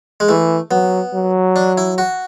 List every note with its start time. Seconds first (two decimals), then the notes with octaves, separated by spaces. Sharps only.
0.20 G#3
0.29 E3 A3
0.71 F#3 B3
1.14 F#3
1.56 D4
1.78 E4
1.98 F#4